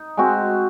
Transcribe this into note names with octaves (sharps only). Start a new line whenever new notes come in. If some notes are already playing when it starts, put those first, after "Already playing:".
Already playing: D#4
G#3 C4 F#4